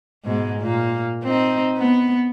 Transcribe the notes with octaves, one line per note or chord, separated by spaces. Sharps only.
G#2 B2 G#3
A#2 A#3
C4 D#4
B3